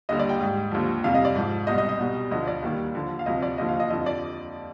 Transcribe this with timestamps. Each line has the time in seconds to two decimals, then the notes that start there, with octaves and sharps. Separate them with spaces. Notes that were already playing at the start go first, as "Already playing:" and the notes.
0.09 D#2 D3 G3 D#5
0.19 D5
0.29 G5
0.40 G#2 G3
0.71 D#2 D3 F3
1.04 F2 C3 G3 F5
1.15 D#5
1.25 D5
1.35 G#2 F3
1.67 C2 B2 G3 D#5
1.78 D#5
1.89 D#5
1.99 C2 B2 G3
2.31 D2 D3 F3 D#5
2.47 D5
2.62 D#2 D#3 G3
2.95 D#2 D3 F3
3.19 F5
3.26 D2 C3 F3 D#5
3.42 D5
3.58 D#2 D3 F3 D#5
3.69 F5
3.80 D#5
3.90 F2 D3 F3 D#5
4.06 D5